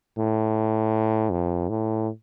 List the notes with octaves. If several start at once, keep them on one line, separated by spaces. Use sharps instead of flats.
A2
F2
A2